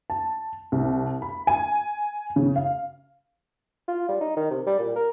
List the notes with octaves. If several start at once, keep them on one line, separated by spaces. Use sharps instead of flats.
A5
C2
B5
G#5
C#3
F5
F4
G3
D#4
D#3
C3
G3
A#2
A#4